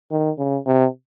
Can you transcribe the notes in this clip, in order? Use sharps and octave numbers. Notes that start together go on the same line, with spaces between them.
D#3
C#3
C3